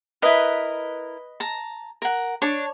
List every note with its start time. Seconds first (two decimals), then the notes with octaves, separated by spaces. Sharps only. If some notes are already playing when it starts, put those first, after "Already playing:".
0.22 E4 A#4 B4 D#5
1.40 A5 A#5
2.02 A#4 F#5
2.42 D4 C#5